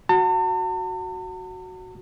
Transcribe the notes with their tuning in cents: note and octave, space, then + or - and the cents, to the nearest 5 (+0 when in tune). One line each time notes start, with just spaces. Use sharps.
F#4 +0 A5 +45